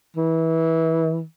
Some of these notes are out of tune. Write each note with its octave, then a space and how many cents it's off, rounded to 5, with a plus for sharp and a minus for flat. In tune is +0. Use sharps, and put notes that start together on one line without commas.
E3 -25